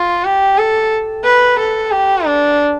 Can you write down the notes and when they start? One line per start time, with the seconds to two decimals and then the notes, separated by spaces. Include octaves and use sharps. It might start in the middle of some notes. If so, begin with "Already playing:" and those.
Already playing: F4
0.24 G4
0.58 A4
1.25 B4
1.59 A4
1.91 G4
2.26 D4